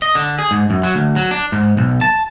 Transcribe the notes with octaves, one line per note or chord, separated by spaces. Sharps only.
D#5
D3
G#4
G#2
F#2
F#3
D2
F#3
D4
G#2
B1
A5